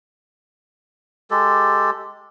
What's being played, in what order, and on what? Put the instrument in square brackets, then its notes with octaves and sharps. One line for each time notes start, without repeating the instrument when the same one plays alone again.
[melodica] G#3 G4 A4